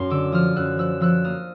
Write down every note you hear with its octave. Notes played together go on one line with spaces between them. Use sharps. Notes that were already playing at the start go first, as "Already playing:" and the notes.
Already playing: F#2 C6
D3 D6 E6
F3 D#6 F6
F#2 E6 F#6
F3 E6 F#6
F3 E6 F#6
A#3 D#6 F6